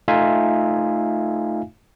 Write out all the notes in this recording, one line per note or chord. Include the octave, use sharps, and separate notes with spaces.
A3 D#4 F4 E5 F5 G#5